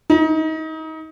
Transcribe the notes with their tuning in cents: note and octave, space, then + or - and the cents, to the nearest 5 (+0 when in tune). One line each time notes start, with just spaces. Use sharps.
D#4 +30